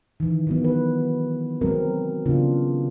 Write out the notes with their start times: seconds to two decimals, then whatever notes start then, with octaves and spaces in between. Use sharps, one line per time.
0.20 D#3 E3
0.47 D#3 F#3 B3
0.65 B4
1.61 F#3 G#3 C4 A#4
2.26 C#3 B3 D4 F4